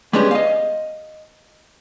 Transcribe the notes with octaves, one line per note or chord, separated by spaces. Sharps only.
G3 G#3 B3 C#4 D4 G4
D#5 F5